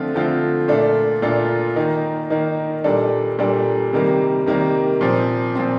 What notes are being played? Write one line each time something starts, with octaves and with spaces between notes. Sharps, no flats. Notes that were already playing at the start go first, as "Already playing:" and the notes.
Already playing: D3 F3 A3 C4 F4
D3 F3 A3 C4 F4
A#2 A3 D4 F4 A4
A#2 A3 D4 F4 A4
D#3 A#3 D#4
D#3 A#3 D#4
A#2 G3 D4 A4
A#2 G3 D4 A4
C3 D#3 G3 A#3
C3 D#3 G3 A#3
A#2 F3 C4
A#2 F3 C4